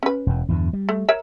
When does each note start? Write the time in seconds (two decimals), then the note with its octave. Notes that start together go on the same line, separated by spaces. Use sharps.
0.03 C#4 B4
0.27 E1 E2
0.49 E2 G2 D3
0.73 G3
0.89 A3
1.09 A#4 C#5 E5